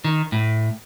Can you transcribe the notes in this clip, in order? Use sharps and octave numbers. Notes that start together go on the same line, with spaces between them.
D#3
A2